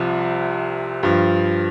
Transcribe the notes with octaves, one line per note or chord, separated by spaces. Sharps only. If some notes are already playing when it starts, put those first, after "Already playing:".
Already playing: C2 C3 F3
G2 F3